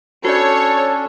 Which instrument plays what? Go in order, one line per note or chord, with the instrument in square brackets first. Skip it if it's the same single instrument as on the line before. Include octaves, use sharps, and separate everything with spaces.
[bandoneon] C#4 D4 [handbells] F#4 D5 [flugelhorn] A4 [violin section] C#5